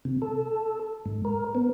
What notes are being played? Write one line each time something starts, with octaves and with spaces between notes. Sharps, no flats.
C3
A4
G#2
A#4
B3